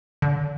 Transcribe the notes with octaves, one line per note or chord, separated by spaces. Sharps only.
D3